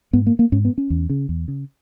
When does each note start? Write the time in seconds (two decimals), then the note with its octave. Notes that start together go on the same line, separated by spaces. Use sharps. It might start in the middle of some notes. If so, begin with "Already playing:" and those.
0.13 G#2 B3
0.27 A#3
0.39 A#3
0.52 G#2 C#4
0.65 B3
0.78 C#4
0.90 E2
1.10 C#3
1.29 E2
1.48 C#3